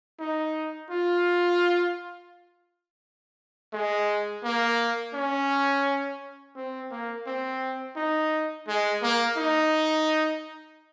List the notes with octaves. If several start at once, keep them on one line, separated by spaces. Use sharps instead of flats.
D#4
F4
G#3
A#3
C#4
C4
A#3
C4
D#4
G#3
A#3
D#4